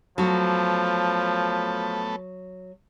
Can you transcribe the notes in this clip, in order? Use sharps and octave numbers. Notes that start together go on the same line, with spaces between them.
F3 F#3 A3 B3 F#4 A4